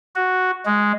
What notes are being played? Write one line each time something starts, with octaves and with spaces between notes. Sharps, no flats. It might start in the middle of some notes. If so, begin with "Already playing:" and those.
F#4
G#3